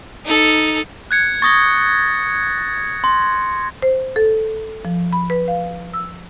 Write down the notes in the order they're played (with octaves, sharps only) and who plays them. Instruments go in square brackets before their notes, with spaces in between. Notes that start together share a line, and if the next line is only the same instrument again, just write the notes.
[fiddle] D#4 A4
[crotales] F#6 G#6 C#7
[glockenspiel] C#6 D#6 G7 [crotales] A6 A#6
[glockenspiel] C6
[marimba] C5
A4
F3
B5
B4
F5
E6